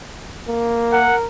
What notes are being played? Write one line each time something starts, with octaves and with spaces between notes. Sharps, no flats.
A#3
A#4 F#5